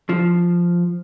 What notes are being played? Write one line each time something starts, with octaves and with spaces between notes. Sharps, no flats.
F3